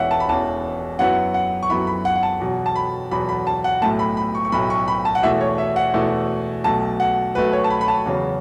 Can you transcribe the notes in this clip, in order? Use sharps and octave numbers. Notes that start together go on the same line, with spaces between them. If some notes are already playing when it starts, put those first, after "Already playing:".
Already playing: E1 E2 E3 C#4 E5 F#5
A5
B5
E1 E2 E3 C#4 A5
F#2 F#3 B3 E4 F#5
F#5
C#6
F#2 F#3 B3 E4 B5
B5
F#5
F#5
A5
E2 B2 F#3
A5
B5
E2 B2 F#3 B5
B5
A5
F#5
B1 A2 A3 A5
B5
B5
C#6
C#6
B1 A2 A3 B5
C#6
B5
A5
F#5
E2 B2 A3 E4 E5
C#5
E5
F#5
E2 B2 A3 E4
B1 B2 A3 A5
F#5
B1 B2 A3 B4
C#5
A5
B5
B5
A5
E2 C#3 F#3 C#4